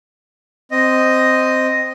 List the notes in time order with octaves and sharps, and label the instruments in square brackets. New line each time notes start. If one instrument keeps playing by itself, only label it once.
[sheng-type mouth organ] C4 D#5